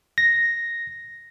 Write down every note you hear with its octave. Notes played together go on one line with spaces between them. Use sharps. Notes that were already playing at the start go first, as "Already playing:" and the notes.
A#6